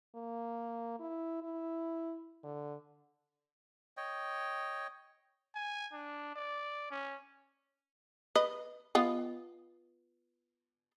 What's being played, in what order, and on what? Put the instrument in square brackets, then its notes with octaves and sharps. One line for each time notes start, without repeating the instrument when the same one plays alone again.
[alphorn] A#3
E4
E4
D3
[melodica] C#5 D#5 G5
[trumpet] G#5
D4
D5
C#4
[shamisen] B4 D#5
B3 F4 D#5